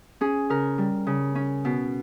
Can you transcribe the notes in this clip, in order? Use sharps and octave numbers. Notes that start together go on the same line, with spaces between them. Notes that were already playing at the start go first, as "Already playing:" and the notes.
C#4 G#4
C#3 A#4
G3
C#3
C#4
B2